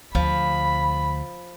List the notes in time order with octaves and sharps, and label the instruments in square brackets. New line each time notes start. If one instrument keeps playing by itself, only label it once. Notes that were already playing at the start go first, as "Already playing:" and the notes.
[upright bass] D2 [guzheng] F3 [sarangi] B5